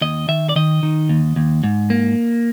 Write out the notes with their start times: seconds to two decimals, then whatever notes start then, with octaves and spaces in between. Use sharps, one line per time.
0.01 D#2 D#5
0.28 D#3 E5
0.49 D5
0.56 D#3 D#5
0.83 D#3
1.09 D#2
1.36 D#2
1.64 G#2
1.90 A#3